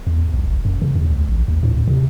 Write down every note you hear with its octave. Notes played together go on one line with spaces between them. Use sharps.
E2
B1
F#1
F#2
C#3
E2
C#2
A1
D#2
A2
D2
C3